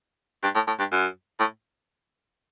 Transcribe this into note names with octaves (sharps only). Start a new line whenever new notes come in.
G2
A2
A2
G2
F#2
A2